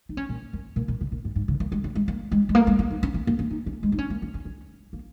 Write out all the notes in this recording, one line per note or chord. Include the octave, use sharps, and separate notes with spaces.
D#4
C#4
A#2
F#2
A#2
A#2
C#3
A#2
G#2
G#2
C#3
A#3
G#3
F#3
G#3
A#3
G#3
G#3
A#3
G#3
A#3
D#4
C#4
A#3
A#3
C#4
D#4
C#4
G#3
D#4
C#4
A#3
C#4
C#4
C#4
A#3